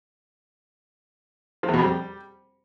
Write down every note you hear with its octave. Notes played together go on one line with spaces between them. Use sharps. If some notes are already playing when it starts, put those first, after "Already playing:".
F3
E2
B2
F2
G3